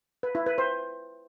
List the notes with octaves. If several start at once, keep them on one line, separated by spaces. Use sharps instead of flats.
B4
E4
B4
C5